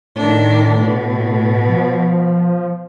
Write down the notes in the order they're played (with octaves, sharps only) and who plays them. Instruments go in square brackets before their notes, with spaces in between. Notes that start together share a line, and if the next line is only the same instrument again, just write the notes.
[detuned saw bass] A2 [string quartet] D#3 D4
[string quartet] B2
[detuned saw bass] F3